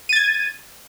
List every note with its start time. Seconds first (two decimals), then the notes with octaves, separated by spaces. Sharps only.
0.09 D#7
0.13 A6
0.16 G#6